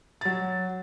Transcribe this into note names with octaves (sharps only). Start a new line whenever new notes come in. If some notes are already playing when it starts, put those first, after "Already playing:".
F#3 A6